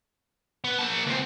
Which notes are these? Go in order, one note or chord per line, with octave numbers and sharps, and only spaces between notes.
B3
A#3 A5
C#2 C4